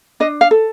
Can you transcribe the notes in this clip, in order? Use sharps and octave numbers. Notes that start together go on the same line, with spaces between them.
D4 D#5
F5
A4